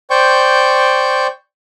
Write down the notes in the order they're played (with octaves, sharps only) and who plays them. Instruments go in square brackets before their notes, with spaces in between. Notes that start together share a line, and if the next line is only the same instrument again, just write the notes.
[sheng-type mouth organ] C5 D5 G5 C#6 G6